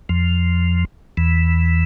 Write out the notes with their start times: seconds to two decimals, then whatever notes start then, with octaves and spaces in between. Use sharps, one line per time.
0.09 F2 F3
1.17 E2 E3